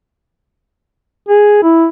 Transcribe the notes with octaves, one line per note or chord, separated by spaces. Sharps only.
G#4
E4